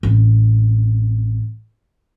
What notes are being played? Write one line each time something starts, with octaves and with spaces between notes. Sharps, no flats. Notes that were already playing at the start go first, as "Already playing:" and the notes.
A1 C4